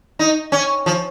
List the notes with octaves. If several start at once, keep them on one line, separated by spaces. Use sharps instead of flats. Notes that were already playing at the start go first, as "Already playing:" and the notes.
D#4
C#4
F3